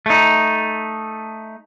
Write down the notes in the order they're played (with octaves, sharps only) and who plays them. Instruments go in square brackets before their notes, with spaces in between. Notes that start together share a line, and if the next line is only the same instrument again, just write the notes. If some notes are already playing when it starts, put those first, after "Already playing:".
[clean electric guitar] A3 D#4